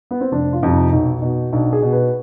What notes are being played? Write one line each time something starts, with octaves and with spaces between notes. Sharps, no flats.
B3
C4
F1 D4
F4
F2 C3 F4
D#4
B1
B2
B1 D4
G#4
B2
B4